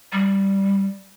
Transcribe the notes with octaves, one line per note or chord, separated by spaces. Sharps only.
G3